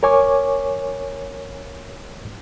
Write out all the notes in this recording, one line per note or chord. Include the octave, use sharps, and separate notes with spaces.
A#4 C#5 G#5 C#6 D6